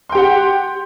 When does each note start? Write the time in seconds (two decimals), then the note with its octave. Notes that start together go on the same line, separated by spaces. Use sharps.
0.09 C6
0.12 G5
0.15 G4
0.18 F#5